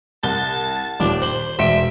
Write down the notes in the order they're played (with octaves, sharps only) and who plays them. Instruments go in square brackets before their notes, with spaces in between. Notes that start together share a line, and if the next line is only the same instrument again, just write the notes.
[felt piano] C2 [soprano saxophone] A5 [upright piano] G7
[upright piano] D#1 [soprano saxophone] D4 [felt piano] D6
[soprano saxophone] C5 [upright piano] F#7
[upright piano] E1 D7 [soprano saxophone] E5 [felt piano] C6